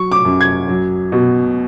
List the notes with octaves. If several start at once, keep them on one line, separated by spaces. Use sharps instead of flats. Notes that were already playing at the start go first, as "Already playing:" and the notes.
Already playing: F#3 C#6
D6
F#2
G#6
F#3
B2